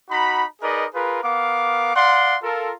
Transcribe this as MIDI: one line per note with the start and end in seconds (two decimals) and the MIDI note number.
0.10 0.45 63
0.10 0.45 66
0.10 0.45 82
0.10 0.45 83
0.61 0.85 63
0.61 0.85 68
0.61 0.85 70
0.61 0.85 71
0.61 0.85 74
0.61 0.85 75
0.94 1.22 65
0.94 1.22 68
0.94 1.22 70
0.94 1.22 71
1.23 1.95 59
1.23 1.95 70
1.23 1.95 77
1.23 1.95 86
1.96 2.36 74
1.96 2.36 77
1.96 2.36 78
1.96 2.36 84
2.43 2.72 65
2.43 2.72 69
2.43 2.72 70